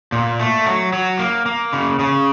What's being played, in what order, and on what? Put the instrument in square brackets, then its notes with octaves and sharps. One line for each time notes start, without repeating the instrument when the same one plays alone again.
[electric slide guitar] A#2
A3
F#3
F#3
A#3
A#3
C#3
C#3